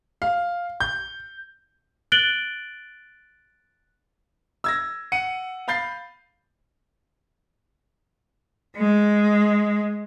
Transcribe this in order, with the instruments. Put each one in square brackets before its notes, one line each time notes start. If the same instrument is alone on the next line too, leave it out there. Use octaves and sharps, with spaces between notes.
[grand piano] F5
G6
[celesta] F#6 A6 D7 F#7 G7
[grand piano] E6 G#6 A#6
F#5 C#7 D#7
F5 B5 G6 A6 C7
[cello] G#3